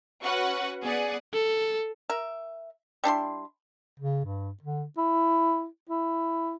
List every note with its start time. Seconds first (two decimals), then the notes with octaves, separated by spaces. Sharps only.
0.23 C#4 F#4 B4 F#5 C#6
0.84 B3 G#4 D5 F#5
1.33 A4
2.09 A#4 E5
3.04 G3 D4 E4 C6
4.00 C#3
4.25 G2
4.63 D3
4.98 E4
5.89 E4